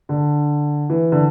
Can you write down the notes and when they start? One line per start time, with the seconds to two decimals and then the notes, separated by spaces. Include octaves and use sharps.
0.09 D3
0.90 E3
1.12 D3